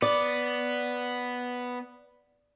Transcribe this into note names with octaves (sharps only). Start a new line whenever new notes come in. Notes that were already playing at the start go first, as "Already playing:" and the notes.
B3 D5